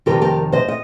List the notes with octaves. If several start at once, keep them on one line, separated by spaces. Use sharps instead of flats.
F2 C3 D#3 G3 G4 A#4
G4 A#4
C5 D#5
D#5